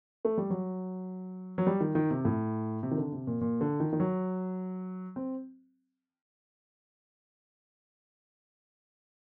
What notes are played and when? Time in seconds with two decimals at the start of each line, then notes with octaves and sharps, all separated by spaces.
0.25 A3
0.38 G3
0.50 F#3
1.58 F#3
1.67 G3
1.81 D#3
1.95 D#3
2.11 C3
2.25 A2
2.83 C3
2.91 D#3
2.98 D3
3.12 C3
3.27 A#2
3.41 A#2
3.61 D3
3.80 D#3
3.93 D#3
4.00 F#3
5.16 C4